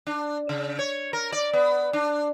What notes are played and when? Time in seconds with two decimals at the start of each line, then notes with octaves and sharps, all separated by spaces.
0.07 D4
0.49 C#3
0.79 C#5
1.13 A#4
1.32 D5
1.53 B3
1.93 D4